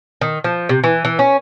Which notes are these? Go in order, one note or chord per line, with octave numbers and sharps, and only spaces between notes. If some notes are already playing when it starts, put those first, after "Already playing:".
D#3
F3
C3
E3
E3
C#4